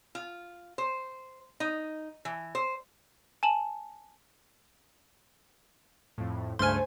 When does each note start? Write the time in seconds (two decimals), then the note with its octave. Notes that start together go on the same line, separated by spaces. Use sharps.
0.15 F4
0.78 C5
1.60 D#4
2.25 E3
2.55 C5
3.43 G#5 A5 E7 F#7
6.18 F2 A2
6.59 C#2 G2 A3 C5 G#5 C6 F6